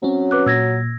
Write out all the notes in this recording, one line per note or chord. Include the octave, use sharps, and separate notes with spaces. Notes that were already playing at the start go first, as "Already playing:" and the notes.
F#3 C4 C#4
B4 D6 F#6
A#2 E6 G#6 A#6